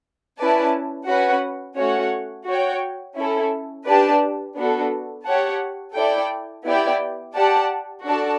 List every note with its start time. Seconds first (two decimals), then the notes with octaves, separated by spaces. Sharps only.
0.38 C#4 E4 B4 D5 A5
1.07 C#4 F#4 B4 F#5
1.78 A3 C#4 F#4 C#5 F#5
2.47 F#4 C#5 G5
3.16 C#4 E4 A4
3.86 D4 G4 B4 D5 A5
4.57 B3 D4 F#4 A4
5.26 G4 C#5 F#5 A5
5.95 E4 A4 D5 G5
6.65 B3 E4 G4 D5 G5
7.34 G4 D5 F#5 A5
8.04 D4 F#4 A4 D5 A5